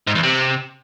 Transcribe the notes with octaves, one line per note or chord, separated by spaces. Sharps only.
G#2
E2
C3